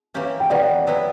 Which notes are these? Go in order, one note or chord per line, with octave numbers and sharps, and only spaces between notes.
E3 A#3 C#4 G4
G5
E3 B3 F#4 A#4 D5 F#5
F#3 B3 E4 B4